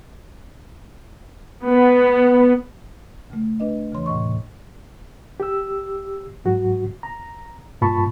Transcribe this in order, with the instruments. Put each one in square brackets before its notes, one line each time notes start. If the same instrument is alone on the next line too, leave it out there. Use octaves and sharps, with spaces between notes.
[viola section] B3
[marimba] D2 C#3 A3
D4 B4 D#5
E2 C#3 E3 C#5 C6
D2 A2 C3 D#5 C#6
[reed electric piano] G4 E6
G#2 F#3 F#4
A#5
G2 A#2 F4 A5 B5 C#6